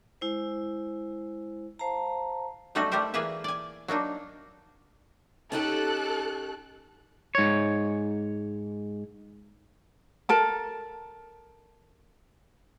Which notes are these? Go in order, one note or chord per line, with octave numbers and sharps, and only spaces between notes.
G#3 E4 C5
C5 F5 A5 A#5
F#3 G3 A3 C#4 D#4 F#4
G3 A3 G4 A#4 C5
E3 A#3 G#4 B4 E5
D5 G#5
F#3 A#3 D4 D#4
C#4 D#4 G4 A4 F#6
G#2 C#5
A4 A#4 A5